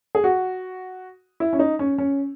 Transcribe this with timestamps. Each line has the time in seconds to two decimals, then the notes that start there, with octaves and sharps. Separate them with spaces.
0.15 G#4
0.24 F#4
1.40 E4
1.53 C#4
1.59 D#4
1.79 C#4
1.98 C#4